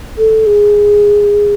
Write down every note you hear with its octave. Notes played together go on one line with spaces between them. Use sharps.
A4
G#4